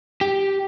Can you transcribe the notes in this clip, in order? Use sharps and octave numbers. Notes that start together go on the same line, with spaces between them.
G4